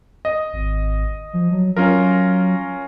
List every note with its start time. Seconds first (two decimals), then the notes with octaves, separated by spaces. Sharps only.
0.25 D#5
0.53 G#1
1.33 F3
1.51 F#3
1.76 F#3 C#4 F4 A#4